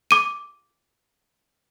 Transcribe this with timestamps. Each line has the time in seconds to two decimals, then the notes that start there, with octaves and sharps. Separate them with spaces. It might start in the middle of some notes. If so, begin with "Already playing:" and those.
0.11 D6 D#7